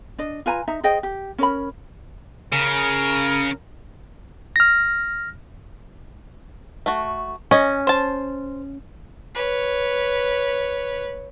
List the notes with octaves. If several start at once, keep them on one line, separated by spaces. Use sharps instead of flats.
D4 D#5
F4 B4 G#5 A#5
D#4 E5 A#5
G#4 C5 D#5 G5
G4
C#4 A#4 B5
C#3 A#4
F6 A#6
A3 F#4
C#4 D#5 G#5
C5 A5
B4 C#5